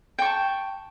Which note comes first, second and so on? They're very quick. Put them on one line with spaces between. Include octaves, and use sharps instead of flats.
G5 C#6 A5